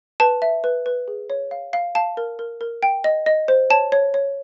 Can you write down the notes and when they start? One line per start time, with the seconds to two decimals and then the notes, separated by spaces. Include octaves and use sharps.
0.20 B4 A5
0.42 E5
0.64 B4
0.86 B4
1.08 G#4
1.30 C#5
1.51 F5
1.73 F5
1.95 F5 A5
2.17 A#4
2.39 A#4
2.61 A#4
2.83 G5
3.04 D#5
3.26 D#5
3.48 C5
3.70 C#5 A5
3.92 C#5
4.14 C#5